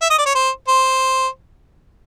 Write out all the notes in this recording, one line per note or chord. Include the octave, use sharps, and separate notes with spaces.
E5
D#5
D5
C#5
C5
C5